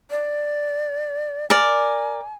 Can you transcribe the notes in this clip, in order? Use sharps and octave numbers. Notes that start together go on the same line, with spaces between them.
D5
A#4 D5 G#5